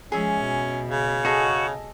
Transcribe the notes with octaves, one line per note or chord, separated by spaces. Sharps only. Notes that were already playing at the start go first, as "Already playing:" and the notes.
F3 G#3 C#4 G#4 E5
B2
C#3
F#4 G#4 A4 D#5